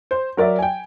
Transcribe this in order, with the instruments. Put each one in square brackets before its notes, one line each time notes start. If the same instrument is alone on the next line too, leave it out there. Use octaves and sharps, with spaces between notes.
[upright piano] C5
F#3 A#4 D5 E5
G5 G#5